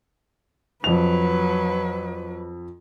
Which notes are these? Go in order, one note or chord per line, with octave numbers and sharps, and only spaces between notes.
F2 F#3 B4 F7